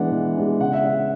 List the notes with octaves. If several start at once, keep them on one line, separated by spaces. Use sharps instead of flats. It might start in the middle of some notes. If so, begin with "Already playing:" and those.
Already playing: E3 G#3 B3 D4 F#5
E3
G#3 B3 D4
C#3 F#5
E5
G#3 C#4 F#5